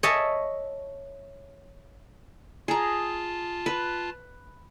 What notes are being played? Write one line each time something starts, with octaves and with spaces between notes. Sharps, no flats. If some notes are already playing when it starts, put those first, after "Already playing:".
C#5 D#5 E5 A5
F4 G#4 A5 A#5
B4